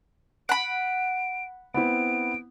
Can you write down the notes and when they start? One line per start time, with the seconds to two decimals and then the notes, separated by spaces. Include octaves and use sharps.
0.49 F#5 B5 D7
1.74 B3 C4 E4 D7